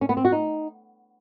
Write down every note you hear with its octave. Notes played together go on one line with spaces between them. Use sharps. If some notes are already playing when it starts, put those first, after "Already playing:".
C#4
B3
C4
F#4
D#4